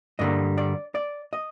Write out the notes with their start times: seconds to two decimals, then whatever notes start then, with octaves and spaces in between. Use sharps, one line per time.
0.19 G2 D3 G3 A#3 D#5
0.58 D5
0.95 D5
1.33 D#5